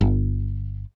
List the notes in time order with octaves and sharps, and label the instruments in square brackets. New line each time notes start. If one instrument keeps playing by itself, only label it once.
[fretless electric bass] G1